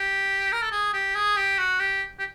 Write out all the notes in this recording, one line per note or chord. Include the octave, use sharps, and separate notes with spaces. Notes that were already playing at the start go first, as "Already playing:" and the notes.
Already playing: G4
A#4
A4
G#4
G4
G#4
G4
F#4
G4
G4